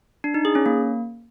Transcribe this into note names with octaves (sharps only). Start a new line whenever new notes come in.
D4
D#4
G#4
C#4
A#3